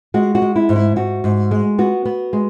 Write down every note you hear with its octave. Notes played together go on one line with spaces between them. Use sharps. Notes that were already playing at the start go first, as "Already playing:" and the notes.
G#3 F#4
F#4
G#3
E4
G#2
E4
G#2 F#4
G#2
G#3
B3 F#4
B3
G#3